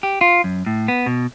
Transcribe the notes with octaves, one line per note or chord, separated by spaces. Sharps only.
G4
F4
F#2
A2
B3
B2